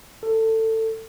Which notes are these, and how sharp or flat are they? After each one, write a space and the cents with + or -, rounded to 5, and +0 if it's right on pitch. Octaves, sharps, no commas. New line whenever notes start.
A4 +20